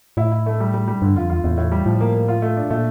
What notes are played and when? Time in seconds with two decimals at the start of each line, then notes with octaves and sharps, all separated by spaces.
0.17 A2 E4
0.32 E4
0.46 A3
0.60 G3
0.74 G3
0.88 G3
1.02 G2 D3
1.16 F2 F4
1.30 E2 F4
1.44 E2 A2
1.57 A2
1.72 G3
1.86 A2 F3
2.01 A#3
2.15 A#3
2.28 F4
2.42 A3
2.57 D4
2.70 A#2 A3